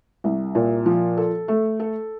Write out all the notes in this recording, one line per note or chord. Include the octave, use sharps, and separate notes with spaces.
C2
A#2
F3
A4
A3
A4